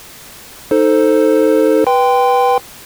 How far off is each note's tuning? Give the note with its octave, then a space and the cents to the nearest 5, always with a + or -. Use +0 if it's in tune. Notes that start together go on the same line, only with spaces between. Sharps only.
D#4 +0 A4 +0 C5 +0
B4 -10 G5 +0 C6 -25